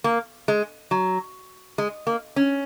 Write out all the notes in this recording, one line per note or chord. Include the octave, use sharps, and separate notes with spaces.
A#3
G#3
F#3
G#3
A#3
C#4